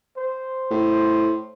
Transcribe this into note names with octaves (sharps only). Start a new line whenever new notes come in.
C5
A2